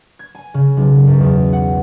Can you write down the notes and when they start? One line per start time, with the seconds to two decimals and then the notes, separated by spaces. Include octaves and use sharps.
0.19 G#6
0.35 G#5
0.54 C#3
0.77 B1
1.07 F#2
1.20 E2
1.53 F#5